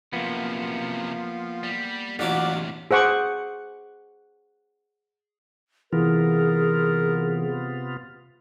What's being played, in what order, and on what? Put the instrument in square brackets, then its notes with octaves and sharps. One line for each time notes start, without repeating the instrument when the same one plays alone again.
[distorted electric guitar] F#2 C3 [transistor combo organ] F3 [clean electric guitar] A#3 B3
[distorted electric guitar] G3
[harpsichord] A1 F#3 D6 [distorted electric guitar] A2 C3 [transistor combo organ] D4 F4 F#5
[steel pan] G#4 C5 F#5 C#6 D6
[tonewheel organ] C3 B3 F4 [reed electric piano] E3 [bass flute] G#4 [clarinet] A#4